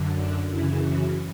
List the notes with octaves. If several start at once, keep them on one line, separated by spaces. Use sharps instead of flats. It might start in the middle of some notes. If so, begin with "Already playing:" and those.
Already playing: F#2 D3
D4
F#2 C#3 E3 E4
F#4